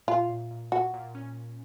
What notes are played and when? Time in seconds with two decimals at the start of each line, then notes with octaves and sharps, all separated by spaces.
0.07 A#2 F4
0.29 A#2
0.51 A#2
0.72 A#2 F#4
0.94 A#2
1.15 C#4